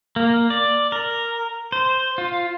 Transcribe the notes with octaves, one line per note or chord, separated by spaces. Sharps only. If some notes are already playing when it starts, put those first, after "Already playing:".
A#3
D5
A#4
C5
F4